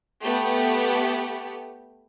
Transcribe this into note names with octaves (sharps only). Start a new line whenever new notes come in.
A3 B3 G4